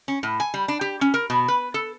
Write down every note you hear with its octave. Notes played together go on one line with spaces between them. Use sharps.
C#4
A2
G#5
G3
D4
G4
C#4
A#4
B2
B4
A4